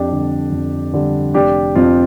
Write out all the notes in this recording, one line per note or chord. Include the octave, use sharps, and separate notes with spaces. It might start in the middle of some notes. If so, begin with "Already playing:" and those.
Already playing: F2 D4 G4
D3 G3
F2
D3 G3
F1 D4 G4
F2 C3 C4 F4